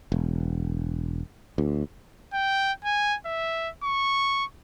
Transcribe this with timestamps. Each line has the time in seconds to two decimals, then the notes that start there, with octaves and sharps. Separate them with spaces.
0.12 E1
1.58 D2
2.33 G5
2.85 G#5
3.26 E5
3.83 C#6